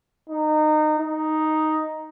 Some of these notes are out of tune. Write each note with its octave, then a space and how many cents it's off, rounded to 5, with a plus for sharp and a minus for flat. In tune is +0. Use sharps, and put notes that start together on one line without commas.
D#4 -25
D#4 +0